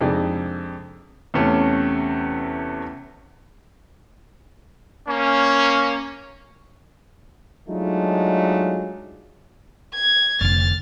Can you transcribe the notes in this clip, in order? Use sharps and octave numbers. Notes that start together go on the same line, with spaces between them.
F2 C3 G#3 D4 D#4
E2 C3 A3 C#4
A#3 C#4
F#3 G#3 A3 D4 D#4 F4
G#6
F1 D3 F6 A6